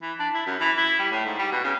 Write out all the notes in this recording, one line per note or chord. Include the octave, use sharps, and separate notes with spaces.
E3
D4
E4
F#2
E3
E4
G3
A2
G#2
G3
B2
C#3